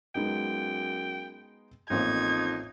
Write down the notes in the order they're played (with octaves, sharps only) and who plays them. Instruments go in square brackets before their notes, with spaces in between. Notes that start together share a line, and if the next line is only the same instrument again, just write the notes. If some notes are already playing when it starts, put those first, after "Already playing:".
[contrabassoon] F#2 [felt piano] G#3 B3 D#4 [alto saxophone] G5
[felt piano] A1 A#3 C4 [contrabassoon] F2 [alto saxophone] D#4 [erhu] G#6